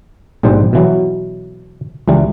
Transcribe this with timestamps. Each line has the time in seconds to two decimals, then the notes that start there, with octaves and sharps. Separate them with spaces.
0.43 A#1 G#2 B2 G3 C5
0.73 B2 E3 F#3
2.08 C#2 E3 G3